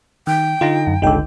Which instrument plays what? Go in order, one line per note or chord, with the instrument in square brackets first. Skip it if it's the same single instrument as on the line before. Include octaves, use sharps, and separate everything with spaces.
[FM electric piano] D#3 [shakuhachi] G5
[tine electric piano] D3 D#4 A#6 [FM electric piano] F4
[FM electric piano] F#2
[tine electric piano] G1 C#2 D3 [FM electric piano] D#4 G5